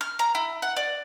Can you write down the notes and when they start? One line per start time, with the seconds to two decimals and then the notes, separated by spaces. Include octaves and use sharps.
0.01 F6
0.19 A#5
0.35 E4
0.62 F#5
0.76 D5